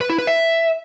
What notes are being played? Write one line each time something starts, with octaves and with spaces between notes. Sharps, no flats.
B4
E4
B4
E5